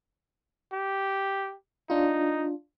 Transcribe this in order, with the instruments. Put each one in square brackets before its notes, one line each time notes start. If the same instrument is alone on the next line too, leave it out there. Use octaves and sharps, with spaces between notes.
[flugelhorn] G4
[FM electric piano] D4 F4 [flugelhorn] D#4